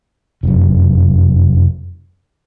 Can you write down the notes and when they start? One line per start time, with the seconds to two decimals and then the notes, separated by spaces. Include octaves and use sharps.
0.43 F1 F#2